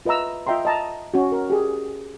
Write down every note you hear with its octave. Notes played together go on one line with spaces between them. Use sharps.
F4 B4 D#5 E5 A#5 E6
F4 D#5 E5 G5 A#5 C6
D#5 A5 A#5
C#4 F#4
A#4
G4 G#4